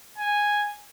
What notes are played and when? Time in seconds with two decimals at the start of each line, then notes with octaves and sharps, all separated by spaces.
0.18 G#5